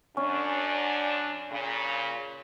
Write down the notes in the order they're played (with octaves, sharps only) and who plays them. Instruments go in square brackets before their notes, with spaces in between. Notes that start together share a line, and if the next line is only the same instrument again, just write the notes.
[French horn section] F#2 D4 [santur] C#4
[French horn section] A#2 C#3